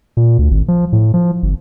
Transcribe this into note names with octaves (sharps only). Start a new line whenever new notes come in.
A#2
D2
G#1
F3
A2
F3
G1